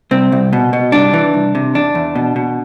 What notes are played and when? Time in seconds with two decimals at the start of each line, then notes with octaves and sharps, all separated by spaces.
0.11 C2 C4
0.32 C2
0.53 B2
0.73 B2
0.92 C2 D4
1.14 E3
1.34 C2
1.55 C3
1.74 E2 D4
1.95 E2
2.15 B2
2.36 B2